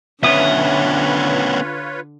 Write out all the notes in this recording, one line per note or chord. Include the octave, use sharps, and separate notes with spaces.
D3 B3 C#4 F4 B4 C#5 E5 D#6